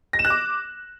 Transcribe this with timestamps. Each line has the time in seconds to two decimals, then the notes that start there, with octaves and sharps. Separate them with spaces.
0.13 A#6
0.19 E7
0.25 F#6
0.30 D6